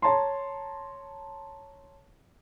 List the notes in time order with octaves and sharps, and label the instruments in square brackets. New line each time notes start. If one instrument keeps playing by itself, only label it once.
[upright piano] C#5 A5 A#5 C6